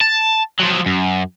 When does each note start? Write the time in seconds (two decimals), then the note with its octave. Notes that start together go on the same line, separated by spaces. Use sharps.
0.01 A5
0.60 F3 F#3
0.86 F#2